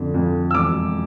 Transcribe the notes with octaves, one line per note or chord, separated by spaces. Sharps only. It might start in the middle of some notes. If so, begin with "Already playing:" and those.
Already playing: F2 D3
F2
E6
E1 D6